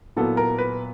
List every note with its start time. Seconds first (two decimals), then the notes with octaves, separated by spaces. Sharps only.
0.17 A#2 F#3 B3 E4 A4
0.37 A#4
0.58 B4